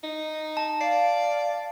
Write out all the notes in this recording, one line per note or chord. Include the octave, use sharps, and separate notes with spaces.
D#4
A5
D5 F5 C7